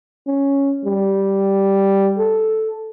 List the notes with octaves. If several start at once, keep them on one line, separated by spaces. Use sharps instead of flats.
C#4
G3
A4